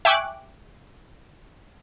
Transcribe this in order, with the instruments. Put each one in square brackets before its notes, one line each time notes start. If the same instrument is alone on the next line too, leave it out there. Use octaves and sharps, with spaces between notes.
[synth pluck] E5 G5 G#5 C#6 D6 F#6